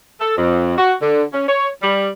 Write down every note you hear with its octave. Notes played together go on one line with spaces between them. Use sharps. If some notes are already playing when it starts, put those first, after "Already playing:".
A4
F2
F#4
D3
C#4
C#5
G3